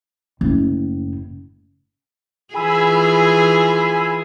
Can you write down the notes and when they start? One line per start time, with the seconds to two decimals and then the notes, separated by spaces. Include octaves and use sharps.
0.41 F#1 A2
2.54 E3 F4 G#4 G#5 B5 E6